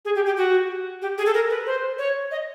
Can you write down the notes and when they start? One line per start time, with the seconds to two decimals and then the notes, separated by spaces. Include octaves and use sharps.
0.05 G#4
0.15 G4
0.26 G4
0.37 F#4
1.02 G4
1.18 G#4
1.26 A4
1.34 A#4
1.50 B4
1.66 C5
1.98 C#5
2.31 D#5